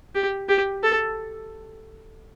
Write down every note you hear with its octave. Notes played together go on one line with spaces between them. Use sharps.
G4
G4
A4